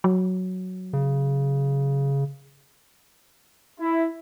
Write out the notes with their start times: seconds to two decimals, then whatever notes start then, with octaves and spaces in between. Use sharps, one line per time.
0.04 F#3
0.93 C#3
3.79 E4